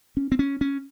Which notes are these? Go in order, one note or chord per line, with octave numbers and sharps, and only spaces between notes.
C#4
C4
C#4
C#4